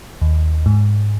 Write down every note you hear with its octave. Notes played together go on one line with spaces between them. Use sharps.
D#2
G#2